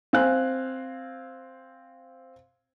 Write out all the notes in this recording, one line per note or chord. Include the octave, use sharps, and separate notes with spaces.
C4 F5 G#5 F#6